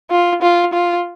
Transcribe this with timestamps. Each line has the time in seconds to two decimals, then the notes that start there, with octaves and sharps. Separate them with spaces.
0.11 F4
0.42 F4
0.73 F4